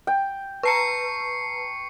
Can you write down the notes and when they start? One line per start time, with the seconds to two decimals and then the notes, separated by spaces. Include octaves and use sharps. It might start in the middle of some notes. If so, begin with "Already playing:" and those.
0.07 G5
0.63 B4 A5 A#5 C#6 C7 C#7